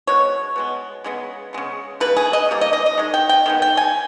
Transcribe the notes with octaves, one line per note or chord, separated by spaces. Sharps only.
B2 G#3 C#5
B2 G#3 B3
C#3 G#3 B3
C#3 G#3 B3
C#3 G3 A#3 B4
G#4
D#5
C#3 G3 A#3
D#5
D#5
D#5
D#3 G#3
G5
G5
D#3 G#3 B3
G5
G#5